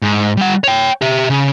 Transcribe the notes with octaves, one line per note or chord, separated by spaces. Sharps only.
G#2
G3 F#5
C#5 G5
G4 E5
C#3